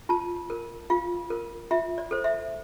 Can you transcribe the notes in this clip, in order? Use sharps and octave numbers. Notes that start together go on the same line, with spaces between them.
F4 A5
A#4
F4 F5
A#4
F4 E5
D5
A4 C5
E5